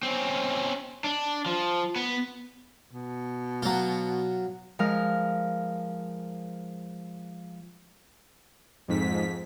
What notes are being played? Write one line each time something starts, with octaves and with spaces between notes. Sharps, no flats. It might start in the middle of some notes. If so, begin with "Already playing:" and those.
C4 C#4
D4
F3
B3
B2
F#3 F4
F3 G#3 A#4 F5
F2 G#2 B6